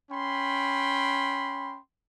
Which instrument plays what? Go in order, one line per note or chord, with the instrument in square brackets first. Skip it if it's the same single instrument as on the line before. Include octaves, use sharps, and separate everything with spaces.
[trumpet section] C#4 G5 B5 C6